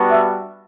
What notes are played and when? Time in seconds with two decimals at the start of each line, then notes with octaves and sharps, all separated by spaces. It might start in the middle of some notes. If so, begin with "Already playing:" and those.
Already playing: G3 B3 D4 F#4
0.10 E5